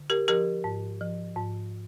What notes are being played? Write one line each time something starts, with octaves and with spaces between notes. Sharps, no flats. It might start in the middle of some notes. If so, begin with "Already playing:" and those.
Already playing: D3
G4 A#4
F3 G4 A#4
G#2
F3
G#2